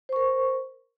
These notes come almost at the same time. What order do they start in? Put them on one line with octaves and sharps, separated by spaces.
C5 C#6 A#4